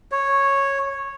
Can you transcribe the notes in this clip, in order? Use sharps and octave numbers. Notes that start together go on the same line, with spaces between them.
C#5